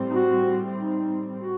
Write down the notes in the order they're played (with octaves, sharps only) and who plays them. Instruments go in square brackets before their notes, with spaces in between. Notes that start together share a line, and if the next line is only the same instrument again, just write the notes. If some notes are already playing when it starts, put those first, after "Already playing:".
Already playing: [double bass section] A2 G3 C4
[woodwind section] D#4
F#4
D#4
F#4